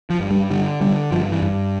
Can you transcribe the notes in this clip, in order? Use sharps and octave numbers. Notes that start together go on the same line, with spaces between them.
F3
G2
G3
D3 G3
D3 G3
G2 F3
E3
G2